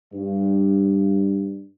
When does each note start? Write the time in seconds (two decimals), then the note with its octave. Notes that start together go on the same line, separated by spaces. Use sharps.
0.13 G2